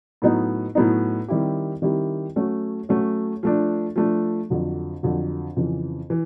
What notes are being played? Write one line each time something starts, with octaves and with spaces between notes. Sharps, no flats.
A2 F#3 B3 D#4
A2 F#3 B3 D#4
D#3 G3 C4 E4 G4
D#3 G3 C4 E4 G4
F#3 A3 C#4 F#4
F#3 A3 C#4 F#4
F3 A3 D4
F3 A3 D4
F2 D3 F#3
F2 D3 F#3
F2 C#3 E3
E3